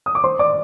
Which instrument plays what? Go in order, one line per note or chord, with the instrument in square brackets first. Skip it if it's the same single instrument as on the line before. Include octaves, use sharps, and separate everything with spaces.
[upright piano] D#6
D6
C5 C6
D5 D6